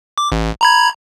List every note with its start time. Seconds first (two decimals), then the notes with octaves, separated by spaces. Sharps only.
0.18 D6
0.32 A1
0.61 A#5 B5 G#6